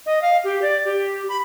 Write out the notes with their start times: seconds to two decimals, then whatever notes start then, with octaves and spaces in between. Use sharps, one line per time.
0.06 D#5
0.22 F5
0.44 G4
0.62 D5
0.85 G4
1.29 B5